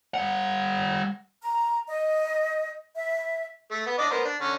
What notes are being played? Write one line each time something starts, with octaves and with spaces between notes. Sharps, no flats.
G3 F#5
A#5
D#5
E5
A3
B3
D4 D#5 D6
B3 A#4 C5
D4
D3 C#4